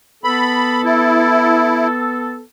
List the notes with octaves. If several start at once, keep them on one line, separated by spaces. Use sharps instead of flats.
B3 A4 B5
E4